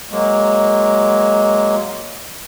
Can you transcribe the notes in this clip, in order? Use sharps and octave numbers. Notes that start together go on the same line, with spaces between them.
F#3 G#3 A#3